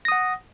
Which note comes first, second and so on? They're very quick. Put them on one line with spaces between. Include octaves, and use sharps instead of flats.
A#6 D#6 F#5